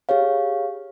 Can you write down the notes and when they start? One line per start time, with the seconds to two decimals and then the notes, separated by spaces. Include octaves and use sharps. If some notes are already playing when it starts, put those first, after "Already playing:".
0.09 G4 G#4 C#5 F5